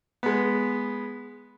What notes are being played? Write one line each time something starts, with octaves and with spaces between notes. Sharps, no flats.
G#3 B3